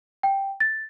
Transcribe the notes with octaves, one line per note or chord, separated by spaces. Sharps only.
G5
A6